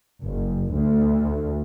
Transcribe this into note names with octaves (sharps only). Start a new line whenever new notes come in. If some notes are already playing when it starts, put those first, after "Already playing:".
F#1
D2